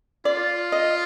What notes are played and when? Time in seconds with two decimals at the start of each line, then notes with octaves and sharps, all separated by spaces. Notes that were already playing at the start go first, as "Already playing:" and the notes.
0.25 F4 D5
0.72 D#5